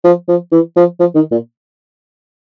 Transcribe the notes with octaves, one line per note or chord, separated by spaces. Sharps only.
F3
F3
E3
F3
F3
D#3
A#2